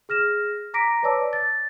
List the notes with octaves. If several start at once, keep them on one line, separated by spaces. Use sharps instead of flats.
G#4 F6 A#6 E7
A#5 D6 A#6 B6 D7
B4 C#5 D5 A5 D6 E6
A6